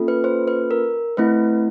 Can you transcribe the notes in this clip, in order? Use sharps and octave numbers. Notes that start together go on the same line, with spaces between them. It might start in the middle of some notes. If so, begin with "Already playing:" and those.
Already playing: A#3 C#4 F4 A4
B4
C5
B4
A#4
A3 C4 E4 B4